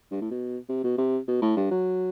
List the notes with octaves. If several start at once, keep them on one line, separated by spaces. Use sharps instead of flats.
G2
A2
B2
C3
B2
C3
B2
A2
G2
F#3